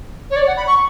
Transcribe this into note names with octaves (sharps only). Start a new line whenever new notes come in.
C#5
D5
F#5
B5
C#6